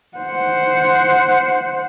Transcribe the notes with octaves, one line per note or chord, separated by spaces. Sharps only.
C5 F#5